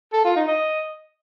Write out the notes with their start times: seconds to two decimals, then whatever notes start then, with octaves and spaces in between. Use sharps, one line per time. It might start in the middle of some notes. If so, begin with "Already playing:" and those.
0.13 A4
0.25 F4
0.36 D#4
0.48 D#5